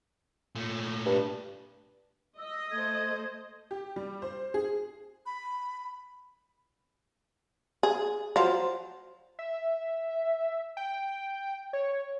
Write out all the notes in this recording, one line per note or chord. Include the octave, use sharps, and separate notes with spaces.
A#2 A3
G2
D#5 E6
A3 C5 G#6
G4
G3
C5
G#4
B5
G#4
F3 F#3 C5
E5
G5
C#5